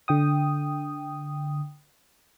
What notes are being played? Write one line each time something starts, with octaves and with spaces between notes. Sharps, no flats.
D3 G5 D#6